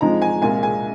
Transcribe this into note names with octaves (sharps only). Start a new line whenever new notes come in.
F2 F3 G#3 D#4 A#5
G#5
C2 A#2 G#3 G#5
G#5